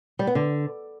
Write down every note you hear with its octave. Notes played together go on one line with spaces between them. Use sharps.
G3
B3
D3